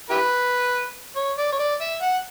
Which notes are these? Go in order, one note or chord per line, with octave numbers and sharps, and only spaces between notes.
E4 G4 B4
C#5
D5
C#5
D5
E5
F#5